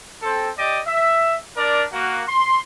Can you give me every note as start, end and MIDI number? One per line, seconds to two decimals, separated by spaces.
0.22 0.49 60
0.22 0.49 69
0.57 0.79 67
0.57 0.79 74
0.57 0.79 75
0.57 0.79 86
0.87 1.36 76
1.57 1.83 62
1.57 1.83 70
1.57 1.83 74
1.92 2.22 58
1.92 2.22 66
2.27 2.60 84